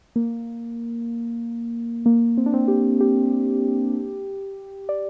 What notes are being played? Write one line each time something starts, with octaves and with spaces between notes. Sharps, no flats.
A#3
A#3
C4
D4
C4
G4
G4
D5